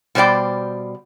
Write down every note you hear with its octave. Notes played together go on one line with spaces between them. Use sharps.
B2 G3 C5 D5 G5